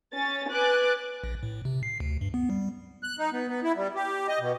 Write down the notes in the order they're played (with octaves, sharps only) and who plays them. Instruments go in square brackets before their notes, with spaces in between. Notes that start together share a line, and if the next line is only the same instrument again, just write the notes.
[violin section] C#4 A6
B4 G#5 D6 F#6 A6
[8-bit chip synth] A#1
A2
C3
C7
D2
G2
B3
G3
[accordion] F#6
D#4
B3
B3
E4
G3
G4
D#5
B2